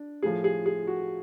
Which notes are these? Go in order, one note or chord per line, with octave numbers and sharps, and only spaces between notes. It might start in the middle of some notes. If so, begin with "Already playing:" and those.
Already playing: D4
A2 F3 G#4
G#4
G#4
F#4